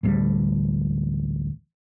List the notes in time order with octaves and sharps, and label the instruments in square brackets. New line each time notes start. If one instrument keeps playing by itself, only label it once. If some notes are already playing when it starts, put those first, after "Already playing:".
[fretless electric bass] A1 D2 A2 G3